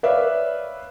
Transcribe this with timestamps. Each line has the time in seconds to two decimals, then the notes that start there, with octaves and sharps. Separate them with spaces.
0.03 B4 C#5 D5 E5 F5